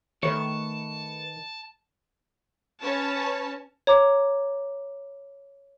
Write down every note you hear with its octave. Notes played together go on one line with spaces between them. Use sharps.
D#3 A3 B4 C#5 A5 C#7
C#4 B4 C#5 A5
C#5 A#5 D6